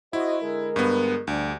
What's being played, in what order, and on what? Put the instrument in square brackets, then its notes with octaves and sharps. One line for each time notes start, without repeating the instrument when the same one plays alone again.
[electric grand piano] E4 [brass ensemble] F#4 C5 D#5
[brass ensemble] D3 G#3 A#4
[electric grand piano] G2 B3
[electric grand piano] D2 [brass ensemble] G3 D4